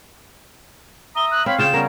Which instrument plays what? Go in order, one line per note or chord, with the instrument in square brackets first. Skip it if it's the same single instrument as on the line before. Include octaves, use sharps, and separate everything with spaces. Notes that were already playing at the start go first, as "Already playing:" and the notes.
[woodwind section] E5 A#5 D#6 [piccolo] G7
[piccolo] F#6
[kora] C4 [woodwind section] C#5 F5 [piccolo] B5
[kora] C#3 F4 G5 [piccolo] E7
[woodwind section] G3 B3 C#4 [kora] A#4